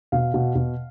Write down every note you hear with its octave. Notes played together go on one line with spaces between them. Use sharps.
B2 F5
B2
B2